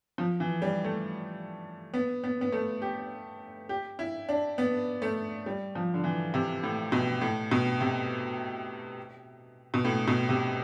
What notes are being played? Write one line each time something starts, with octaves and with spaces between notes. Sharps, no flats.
F3
E3
G3
A3
B3
B3
B3
A3
G4
G4
E4
D4
B3
A3
G3
F3
D3
E3
C3
A2
B2
A2
B2
C3
B2
A2
B2
C3